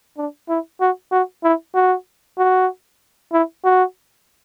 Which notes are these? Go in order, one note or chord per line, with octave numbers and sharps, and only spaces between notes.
D4
E4
F#4
F#4
E4
F#4
F#4
E4
F#4